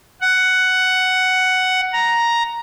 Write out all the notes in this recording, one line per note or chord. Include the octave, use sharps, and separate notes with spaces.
F#5
A#5